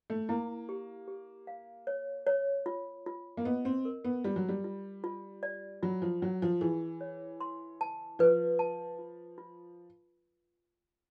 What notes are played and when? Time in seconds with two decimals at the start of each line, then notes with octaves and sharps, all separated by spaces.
0.10 A3
0.29 A#3 E4
0.69 G4
1.08 G4
1.47 F5
1.87 C#5
2.27 C#5
2.66 F4
3.06 F4
3.37 A#3
3.45 B3 D#5
3.65 C4
3.85 A#4
4.05 B3
4.24 G3 F4
4.36 F#3
4.49 G3
4.64 F4
5.04 F4
5.43 D5
5.83 F#3 F4
6.02 F3
6.22 F#3 C#4
6.42 F3
6.61 E3 G#4
7.01 C#5
7.41 C6
7.81 A5
8.19 F3 B4
8.59 A5
8.99 F4
9.38 F4